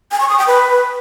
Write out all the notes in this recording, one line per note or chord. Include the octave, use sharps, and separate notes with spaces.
G#5
C#6
D#6
G5
B4